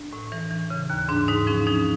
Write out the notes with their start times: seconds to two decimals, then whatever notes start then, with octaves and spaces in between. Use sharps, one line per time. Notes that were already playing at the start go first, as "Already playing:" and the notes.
Already playing: D4
0.13 A2
0.32 E3
0.51 E3
0.70 C#3
0.90 D#2
1.09 G#2 D4
1.28 G#2 D#4
1.47 F3 C#4
1.67 F3 D#4